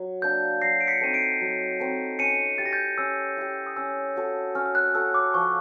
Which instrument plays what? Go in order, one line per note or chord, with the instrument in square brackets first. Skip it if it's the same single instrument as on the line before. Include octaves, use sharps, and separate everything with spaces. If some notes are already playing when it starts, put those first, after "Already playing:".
Already playing: [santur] F#3
[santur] A#3 D4 [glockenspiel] G6
[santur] F#3 [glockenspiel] A#6 C7
[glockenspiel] D7
B6 C#7
[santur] A3 C4 D#4 [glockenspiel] D#7
[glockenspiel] C7 D7
[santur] F#3
A3 C4 D#4
[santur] C#4 [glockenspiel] C#7 D#7
[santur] E4 G4 [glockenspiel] A6
[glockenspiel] A#6
G6 A6
[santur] C#4 [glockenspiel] E6
[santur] E4 G4
[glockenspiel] D#6
[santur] C#4 [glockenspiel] E6
[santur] F#4 A4 C#5
[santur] C#4 [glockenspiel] F6
[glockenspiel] F6
F#6
[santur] F#4 A4 C#5 [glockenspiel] E6
[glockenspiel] D6
[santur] F3 [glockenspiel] C#6